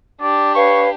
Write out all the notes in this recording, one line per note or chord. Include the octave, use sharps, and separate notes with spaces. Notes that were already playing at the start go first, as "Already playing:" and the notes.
D4 G4 D5
B4 C#5 F5 C#6